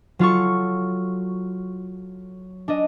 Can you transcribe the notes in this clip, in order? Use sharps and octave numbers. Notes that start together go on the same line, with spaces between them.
F#3 F4 A4 C#6
D4 D#5